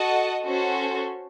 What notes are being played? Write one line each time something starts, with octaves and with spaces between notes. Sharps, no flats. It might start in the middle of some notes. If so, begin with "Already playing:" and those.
Already playing: F#4 A4 D#5 F#5 A5
C#4 F#4 A4 C5